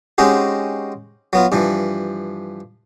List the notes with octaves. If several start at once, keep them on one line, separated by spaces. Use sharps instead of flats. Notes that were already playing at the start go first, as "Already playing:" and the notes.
G#3 C4 C#4 D#4 F#4 G4
F#3 B3 F4
G2 E3 F3